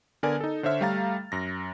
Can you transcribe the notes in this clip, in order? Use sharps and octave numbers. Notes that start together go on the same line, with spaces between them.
D3 B3 A#4 D5 G#5
D#4 A4
D3 C5 C#5 E5 F6
G3 A3 F5 A#5 A6
F#2 A#6